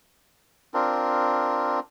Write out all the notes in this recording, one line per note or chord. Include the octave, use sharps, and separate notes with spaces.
C4 D4 F4 A#4